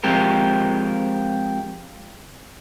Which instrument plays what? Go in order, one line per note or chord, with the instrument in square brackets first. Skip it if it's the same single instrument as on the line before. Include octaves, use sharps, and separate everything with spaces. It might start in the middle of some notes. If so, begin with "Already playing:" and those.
[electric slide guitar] F3 G#3 C4 G4 A#4